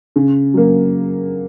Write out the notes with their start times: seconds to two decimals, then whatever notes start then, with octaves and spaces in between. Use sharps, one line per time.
0.16 C#3
0.54 F#3 A#3